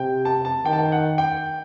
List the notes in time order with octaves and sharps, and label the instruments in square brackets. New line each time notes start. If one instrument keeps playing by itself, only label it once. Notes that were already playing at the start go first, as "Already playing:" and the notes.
Already playing: [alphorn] C3 [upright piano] G5
[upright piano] A5
A5
[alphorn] D#3 [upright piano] G5
[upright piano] A5
G5
F#5
G5